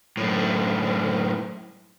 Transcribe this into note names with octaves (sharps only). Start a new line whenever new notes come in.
F#2 A2